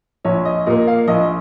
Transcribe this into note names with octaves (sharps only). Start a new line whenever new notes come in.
A#1 C#5
D#5
A#2 A#3 D#5
F5
A#1 D#5